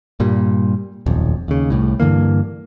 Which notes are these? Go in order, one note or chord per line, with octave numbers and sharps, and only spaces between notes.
G2 A#2 G3
D#1 B1 F2
D#2 C#3
C2 A2
G2 D3 E3 A#3